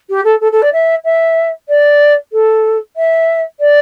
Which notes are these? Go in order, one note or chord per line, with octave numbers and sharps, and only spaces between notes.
G4
A4
A4
A4
D5
E5
E5
D5
A4
E5
D5